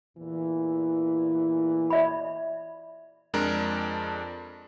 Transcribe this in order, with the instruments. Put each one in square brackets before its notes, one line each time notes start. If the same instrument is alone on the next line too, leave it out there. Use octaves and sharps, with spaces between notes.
[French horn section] E2 A#2 E3
[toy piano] D5 E5 B5
[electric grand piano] F2 G#3 D4 A#4